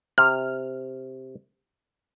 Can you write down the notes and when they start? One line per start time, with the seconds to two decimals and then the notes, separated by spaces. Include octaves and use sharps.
0.18 C3 F6